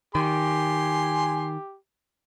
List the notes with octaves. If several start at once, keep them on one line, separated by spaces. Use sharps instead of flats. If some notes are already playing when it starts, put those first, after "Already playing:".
D#3 G4 G#5 C6